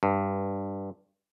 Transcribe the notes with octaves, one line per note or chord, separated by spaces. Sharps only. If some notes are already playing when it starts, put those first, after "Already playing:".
G2